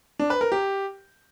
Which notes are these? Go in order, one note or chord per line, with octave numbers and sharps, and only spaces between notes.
D4
B4
A#4
G4